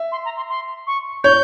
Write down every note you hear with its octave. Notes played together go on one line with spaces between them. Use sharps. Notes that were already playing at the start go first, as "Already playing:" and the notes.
Already playing: E5
C6
A#5
C6
C6
C#6
C#5 G6